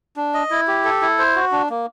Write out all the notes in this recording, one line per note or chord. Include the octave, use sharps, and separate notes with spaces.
D4
D#5
E4
G4
A4
E4
C5
F#4
D4
A#3